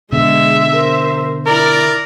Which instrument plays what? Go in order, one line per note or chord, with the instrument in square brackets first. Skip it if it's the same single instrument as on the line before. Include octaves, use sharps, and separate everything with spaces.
[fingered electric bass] B2 D3 [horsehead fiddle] G#3 [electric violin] E5
[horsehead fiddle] A#4 C5
[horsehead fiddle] E4 [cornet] A#4 [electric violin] D5